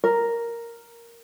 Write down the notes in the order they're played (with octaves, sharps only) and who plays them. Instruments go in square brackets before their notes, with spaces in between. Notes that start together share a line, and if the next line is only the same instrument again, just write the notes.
[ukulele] A#4